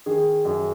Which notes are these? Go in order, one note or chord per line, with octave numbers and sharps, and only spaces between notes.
D#3 G#4
F#2